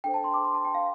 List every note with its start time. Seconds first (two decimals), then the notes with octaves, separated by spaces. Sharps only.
0.04 D4 A4 C5 G5
0.14 A5
0.24 C6
0.34 D6
0.44 C6
0.54 A5
0.65 G5
0.75 F5